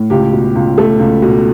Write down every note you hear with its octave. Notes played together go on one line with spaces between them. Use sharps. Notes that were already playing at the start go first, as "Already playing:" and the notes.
Already playing: A2
C#2 G4
B2
C#2
A3 A4
C#2
B2